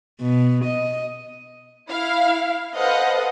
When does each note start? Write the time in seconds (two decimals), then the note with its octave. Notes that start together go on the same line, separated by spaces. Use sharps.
0.20 B2
0.65 D#5
1.89 E4 F5
2.74 A4 B4 C5 D#5 F5 F#5